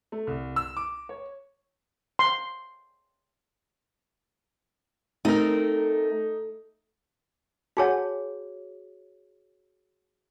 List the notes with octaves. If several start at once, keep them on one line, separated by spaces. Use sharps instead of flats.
A3
C2
E6
D6
C#5
C6
A3 C4 D#4 A#4
F#4 G#4 C#5 F#5 G#5 A5